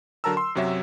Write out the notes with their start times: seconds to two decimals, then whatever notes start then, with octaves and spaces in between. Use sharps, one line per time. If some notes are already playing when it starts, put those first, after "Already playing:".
0.24 D3 F#3 A#4 A5 A#5 E6
0.37 C6
0.55 F#2 C3 F#3 C#5 E5